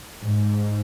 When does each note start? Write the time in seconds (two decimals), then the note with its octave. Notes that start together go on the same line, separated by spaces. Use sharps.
0.20 G#2